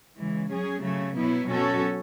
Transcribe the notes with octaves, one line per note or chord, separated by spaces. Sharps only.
C#3 E3 G#3
F#3 C#4 G#4
C#3 F#3 A3
B2 F#3 B3 E4
B2 F#3 C#4 F#4 A4